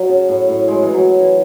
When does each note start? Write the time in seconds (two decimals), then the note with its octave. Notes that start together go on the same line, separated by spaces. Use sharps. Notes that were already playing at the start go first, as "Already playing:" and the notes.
Already playing: F#3
0.09 C#3
0.29 A2
0.49 A2
0.68 G#3
0.83 E3
0.94 F#3
1.20 E3